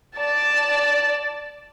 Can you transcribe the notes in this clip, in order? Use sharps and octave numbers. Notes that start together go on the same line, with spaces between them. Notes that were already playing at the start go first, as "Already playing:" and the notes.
D5 A5